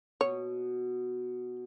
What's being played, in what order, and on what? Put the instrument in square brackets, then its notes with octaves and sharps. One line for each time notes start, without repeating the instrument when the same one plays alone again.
[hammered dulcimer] B2 [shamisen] C#5